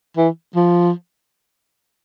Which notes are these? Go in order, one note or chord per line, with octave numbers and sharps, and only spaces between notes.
E3
F3